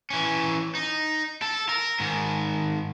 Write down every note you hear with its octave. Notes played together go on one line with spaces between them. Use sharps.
E3 C#4
D#4
A4
A#4
G#2 D#3